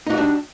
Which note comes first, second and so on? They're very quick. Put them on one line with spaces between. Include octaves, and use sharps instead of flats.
D#4 F#4 G3 D4